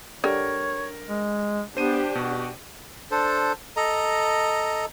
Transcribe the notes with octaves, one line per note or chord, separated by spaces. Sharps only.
D3 G3 A#4 C#5
G#3
B3 D4 G4 C5 D#7
B2 F#4
D4 A4 C5
A4 D#5 A#5